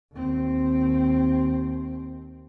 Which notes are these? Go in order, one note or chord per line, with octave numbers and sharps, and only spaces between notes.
D#2 C4